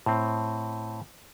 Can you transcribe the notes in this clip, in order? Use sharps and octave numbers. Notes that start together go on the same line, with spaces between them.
A2 C4